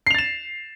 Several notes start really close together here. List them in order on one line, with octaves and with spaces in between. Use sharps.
C7 F7 A6 E7